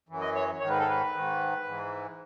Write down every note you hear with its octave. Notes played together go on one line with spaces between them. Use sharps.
F#2 E3
D#5
C#5
G#2 D#3 C#5
B4
A4
B4
G#2 D#3
G#2 E3